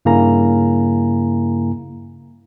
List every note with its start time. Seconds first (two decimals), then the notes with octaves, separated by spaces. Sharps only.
0.05 G2 C#3 A#3 E4 G#5 A#5